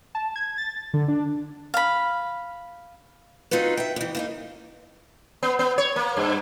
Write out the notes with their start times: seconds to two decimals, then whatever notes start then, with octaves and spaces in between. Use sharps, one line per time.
0.15 A5
0.36 G#6
0.58 A6
0.94 D3
1.08 D4
1.74 F5 B5
3.51 C4 D#4 F4 F#4 B4
3.77 E5 G5
3.96 F2 E3
4.15 A#3 C4 D#4
5.43 B3
5.59 B3
5.78 C#5
5.96 A#3
6.17 G2